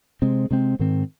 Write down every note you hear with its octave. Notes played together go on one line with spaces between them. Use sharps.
C3 G#3 C4
C3 G#3 C4
G#2 D#3 C4